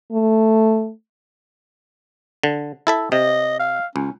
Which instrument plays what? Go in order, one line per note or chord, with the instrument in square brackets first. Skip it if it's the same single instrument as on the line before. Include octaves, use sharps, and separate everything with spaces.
[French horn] A3
[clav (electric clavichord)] D3
E4 A4 E5
[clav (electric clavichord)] C3 [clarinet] D#5
[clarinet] F5
[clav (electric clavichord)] C#2 [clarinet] C#4